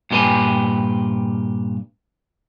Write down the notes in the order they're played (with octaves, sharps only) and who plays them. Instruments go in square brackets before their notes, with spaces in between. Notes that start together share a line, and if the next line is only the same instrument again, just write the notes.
[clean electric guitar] G2 A#2 G4 B4 G#5